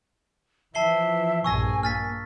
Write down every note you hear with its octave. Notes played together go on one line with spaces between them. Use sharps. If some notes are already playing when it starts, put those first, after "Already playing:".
E3 F3 E5 A5 C7 G7
A#1 G2 B2 G#5 C#6 E6 A#6
A#3 F6 A6 B6